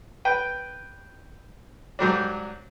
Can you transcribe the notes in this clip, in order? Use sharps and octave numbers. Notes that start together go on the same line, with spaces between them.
B4 G5
G#2 F#3 G3 D4